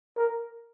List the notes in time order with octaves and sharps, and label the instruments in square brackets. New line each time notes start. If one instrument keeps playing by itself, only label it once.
[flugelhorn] A#4